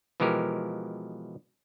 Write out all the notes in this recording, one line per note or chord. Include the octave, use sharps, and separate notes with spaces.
B2 E3 F3 G#3 G4 A#4